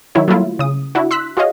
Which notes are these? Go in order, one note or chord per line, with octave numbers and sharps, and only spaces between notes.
D#3 F#3 E4 C#5
F#3 G3 A3 A#3 E4 F4
C#3 D#6
D4 E4 F#4
C6 E6 F#6 B6
F4 F#4 G#4 C#5 D#5 F5